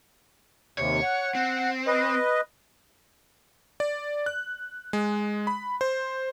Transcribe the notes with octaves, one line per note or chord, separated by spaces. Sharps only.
D#2 C3 C#5
F#5
C4
B4 D#5
D5
F#6
G#3
B5
C5